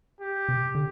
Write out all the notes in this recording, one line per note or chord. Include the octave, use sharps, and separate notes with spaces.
G4
C3
D3